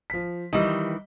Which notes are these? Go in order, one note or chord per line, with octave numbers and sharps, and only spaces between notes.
F3 B6
D#3 E3 G3 D#5